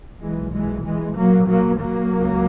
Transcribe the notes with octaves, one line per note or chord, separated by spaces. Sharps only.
B1 A#2 E3 G#3
E3 G#3
E3 G#3
B1 A#2 F#3 A#3
F#3 A#3
F#3 A#3
C#2 C#3